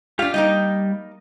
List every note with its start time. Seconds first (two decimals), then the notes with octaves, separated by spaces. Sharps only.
0.19 D4 F4 G4 F5
0.34 G3 A#3 D#4 D#5 G5